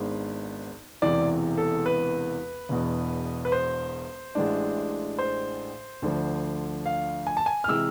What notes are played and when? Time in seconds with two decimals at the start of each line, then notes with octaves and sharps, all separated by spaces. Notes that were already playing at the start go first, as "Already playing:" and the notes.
Already playing: G#1 G#2 G#3 B3 D4
1.02 E1 E2 C3 E3 D5
1.58 A4
1.86 B4
2.69 E1 E2 B2
3.45 B4
3.52 C5
4.35 A1 A2 G#3 D4
5.19 C5
6.02 D2 D3 F3
6.86 F5
7.27 G#5
7.37 A5
7.46 G#5
7.64 F6
7.68 C3 E3 G#3 E6